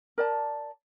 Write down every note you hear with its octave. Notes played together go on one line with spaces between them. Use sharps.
A#4 D5 A5